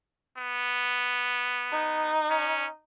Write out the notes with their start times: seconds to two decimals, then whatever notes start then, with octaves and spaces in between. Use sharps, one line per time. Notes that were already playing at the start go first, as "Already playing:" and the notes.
0.38 B3
1.73 D#4
2.30 C#4